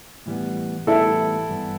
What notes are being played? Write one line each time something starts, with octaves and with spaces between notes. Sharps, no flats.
A2 E3 G3 B3
A2 E3 G3 B3 E4 A4
G2 E3 B3